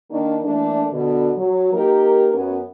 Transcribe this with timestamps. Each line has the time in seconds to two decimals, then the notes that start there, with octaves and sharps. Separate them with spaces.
0.11 D#3 A#3 D4
0.43 E3 A3 A#3 D4
0.93 B2 D3
1.37 F#3
1.73 A#3 D#4 G4 A#4
2.34 F#2 B3 C#4